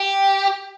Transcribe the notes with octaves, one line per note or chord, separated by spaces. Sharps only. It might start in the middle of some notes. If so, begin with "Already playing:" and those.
Already playing: G4